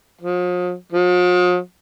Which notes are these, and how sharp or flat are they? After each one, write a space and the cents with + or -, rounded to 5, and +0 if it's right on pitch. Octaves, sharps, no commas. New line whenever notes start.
F3 +40
F3 +45